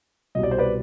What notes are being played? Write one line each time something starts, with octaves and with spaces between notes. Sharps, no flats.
C2 B2 G3 D#5
D5
C5
B4 D5